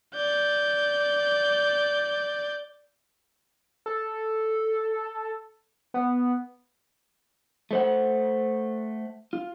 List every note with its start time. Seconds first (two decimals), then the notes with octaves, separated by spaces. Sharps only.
0.14 D5 G6
3.86 A4
5.94 B3
7.71 A3 C5 F#5
9.33 F4